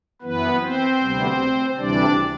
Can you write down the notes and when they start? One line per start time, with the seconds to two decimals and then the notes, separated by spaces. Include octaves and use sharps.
0.21 F#2 E3 B3 B4
0.61 C4 C5
1.00 D2 C3 G3 B3
1.77 D2 C3 E3 G3 D4 D5